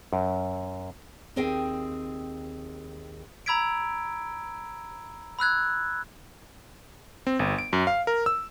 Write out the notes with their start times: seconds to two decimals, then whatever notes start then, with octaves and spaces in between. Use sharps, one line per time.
0.13 F#2
1.36 D#2 C4 G#4 D#5 F5 G5
3.46 A#5 B5 E6 G#6 B6 D7
5.39 B5 E6 F#6 G#6
7.27 C4
7.39 G1
7.58 D7
7.73 F#2
7.87 F5
8.07 A#4
8.26 E6